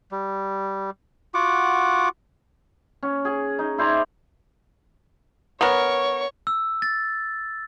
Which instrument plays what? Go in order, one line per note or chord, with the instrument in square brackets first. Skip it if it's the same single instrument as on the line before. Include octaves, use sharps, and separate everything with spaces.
[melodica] G3
F4 F#4 F#5 D6
[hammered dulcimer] C#4
G#4
D#4
E4 C5 D5 A#5
[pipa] B3 A#4 [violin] C#5 C#6
[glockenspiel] E6
A6